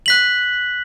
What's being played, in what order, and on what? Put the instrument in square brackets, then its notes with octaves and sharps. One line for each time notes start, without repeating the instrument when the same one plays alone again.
[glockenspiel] F#6 B6 F#7